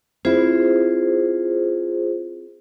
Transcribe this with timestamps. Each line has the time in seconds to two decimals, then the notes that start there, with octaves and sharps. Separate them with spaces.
0.25 C4 E4 F4 G#4 C5